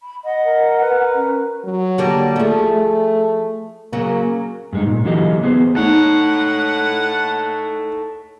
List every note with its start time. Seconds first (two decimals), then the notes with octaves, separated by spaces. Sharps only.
0.01 B5
0.24 D#5 F#5
0.44 A#4
0.81 B4
1.14 C#4
1.64 F#3
1.98 D3 G3 A#3
2.36 F3 A3 G#4
2.72 A3
3.93 C#3 F#3 A#3
4.73 G2 G#3 D#4
4.87 A#2
5.05 D3 E3 F#3 A#3 G4 D#5
5.43 B3 G#4 C5
5.76 A3 D#4 A4 C#5 F#5